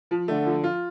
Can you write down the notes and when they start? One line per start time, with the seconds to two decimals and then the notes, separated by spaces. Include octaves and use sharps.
0.11 F3
0.28 D3 A3
0.46 F3
0.64 F4